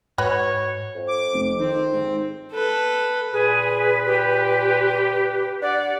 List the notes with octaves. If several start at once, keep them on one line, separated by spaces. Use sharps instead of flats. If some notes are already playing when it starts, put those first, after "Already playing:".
G#2 F#4 B4 C#5
F2
D6
F1
D#3 C4
G#2
A4 B4
C#2 A#2 G#4 B4
G4
D4 G4 D5 F#5